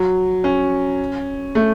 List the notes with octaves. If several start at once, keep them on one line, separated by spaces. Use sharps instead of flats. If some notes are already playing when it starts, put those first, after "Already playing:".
Already playing: F#3
C#4
A3